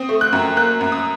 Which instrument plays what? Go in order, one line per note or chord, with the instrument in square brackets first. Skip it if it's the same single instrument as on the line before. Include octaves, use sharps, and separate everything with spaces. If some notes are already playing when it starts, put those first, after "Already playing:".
Already playing: [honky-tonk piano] C4 D#6
A3
F#6
F#2
A#3 F#6
F#2
D#6